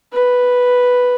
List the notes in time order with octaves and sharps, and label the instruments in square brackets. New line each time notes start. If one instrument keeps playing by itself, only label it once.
[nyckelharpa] B4